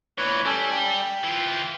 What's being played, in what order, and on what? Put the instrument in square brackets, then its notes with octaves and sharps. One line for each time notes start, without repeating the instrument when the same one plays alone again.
[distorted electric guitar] D2 E3 [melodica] B4 C#5
[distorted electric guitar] G3 [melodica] C#4 A4
[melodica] G5
[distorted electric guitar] E3 F4